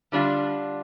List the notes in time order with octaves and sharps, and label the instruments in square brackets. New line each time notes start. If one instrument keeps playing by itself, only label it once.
[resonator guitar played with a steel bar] D3 G3 D4 F4